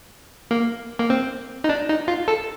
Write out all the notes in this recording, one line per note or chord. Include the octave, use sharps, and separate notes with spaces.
A#3
A#3
C4
D#4
D4
D#4
F4
A4